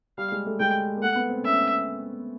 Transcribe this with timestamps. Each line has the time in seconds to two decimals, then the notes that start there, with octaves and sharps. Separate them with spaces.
0.18 G3 F5
0.32 G#3
0.46 A3
0.60 G#3 G5
0.97 A#3
1.02 A3 F#5
1.15 B3
1.29 C4
1.44 C#4 E5